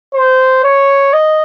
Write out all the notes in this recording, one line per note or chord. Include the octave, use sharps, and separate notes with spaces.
C5
C#5
D#5